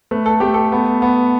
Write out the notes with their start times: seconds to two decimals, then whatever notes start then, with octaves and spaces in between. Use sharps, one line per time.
0.11 A3 B4
0.26 A4
0.40 A3 G4
0.54 A4
0.72 B3
1.02 B3